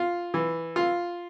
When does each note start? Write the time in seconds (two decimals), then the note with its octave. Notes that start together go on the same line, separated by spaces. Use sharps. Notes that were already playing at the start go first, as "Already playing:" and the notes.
Already playing: F4
0.34 E3
0.76 F4